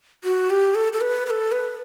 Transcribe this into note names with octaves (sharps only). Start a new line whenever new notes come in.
F#4
G4
A4
A4
B4
B4
A4
B4